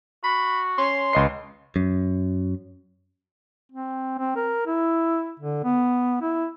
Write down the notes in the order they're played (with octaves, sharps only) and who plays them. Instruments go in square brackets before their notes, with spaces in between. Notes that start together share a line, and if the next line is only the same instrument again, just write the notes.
[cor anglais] F#4 [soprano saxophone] B5
[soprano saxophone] C#4 [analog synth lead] C6
[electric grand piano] C#2 D#5 C7 [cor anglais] B4
[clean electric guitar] F#2
[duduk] C4
C4
A#4
E4
D3
B3
E4